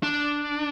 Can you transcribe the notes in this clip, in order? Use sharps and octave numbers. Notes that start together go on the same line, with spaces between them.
D4